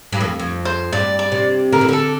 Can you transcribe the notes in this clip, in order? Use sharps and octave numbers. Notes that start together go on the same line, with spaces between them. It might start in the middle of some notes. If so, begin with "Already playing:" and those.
G2
F2
F2
C5
G2 D5
D5
C3
D3 A#4
E3
D3 A4